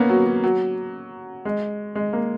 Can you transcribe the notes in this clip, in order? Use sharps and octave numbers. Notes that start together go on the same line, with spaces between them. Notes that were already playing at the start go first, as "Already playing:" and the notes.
Already playing: A#3 B3 C#4
F#3
F#3
F#3
G#3
G#3
A#3